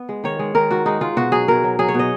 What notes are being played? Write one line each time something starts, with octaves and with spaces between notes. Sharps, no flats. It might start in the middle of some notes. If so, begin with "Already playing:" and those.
Already playing: B3
G#3
D#3 C#5
G#3
D#3 A#4
G#2 F#4
G#3 D#4
G#3 F4
B2 F#4
F#3 G#4
B2 A#4
F#3
F#3 G#4
C#5
B2 D#5